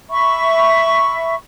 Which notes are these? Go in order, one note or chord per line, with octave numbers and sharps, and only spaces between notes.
E5 B5 C#6